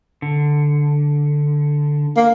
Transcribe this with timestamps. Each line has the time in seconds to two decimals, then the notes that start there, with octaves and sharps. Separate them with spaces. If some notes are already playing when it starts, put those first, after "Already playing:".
0.22 D3
2.16 A#3